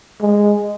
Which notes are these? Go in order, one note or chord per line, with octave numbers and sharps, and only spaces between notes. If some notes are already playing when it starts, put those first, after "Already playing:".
G#3